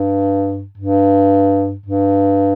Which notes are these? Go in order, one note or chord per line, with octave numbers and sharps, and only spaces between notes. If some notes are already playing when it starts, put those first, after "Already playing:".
Already playing: G2
G2
G2